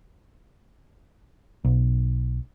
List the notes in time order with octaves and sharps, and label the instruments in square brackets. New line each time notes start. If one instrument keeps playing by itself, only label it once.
[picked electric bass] B1